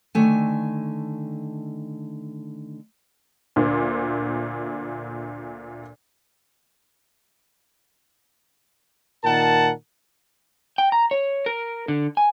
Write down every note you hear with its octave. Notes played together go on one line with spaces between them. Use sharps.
D3 D#3 A3 G#5
D2 A#2
A#2 D#3 A#4 F#5 A5
G5
A#5
C#5
A#4
D3
G#5